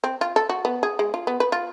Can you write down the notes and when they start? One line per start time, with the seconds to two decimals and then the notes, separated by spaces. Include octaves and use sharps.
0.04 C4
0.21 F4
0.36 A4
0.49 F#4
0.65 B3
0.83 G#4
0.99 G#3
1.14 F4
1.27 B3
1.40 B4
1.52 F4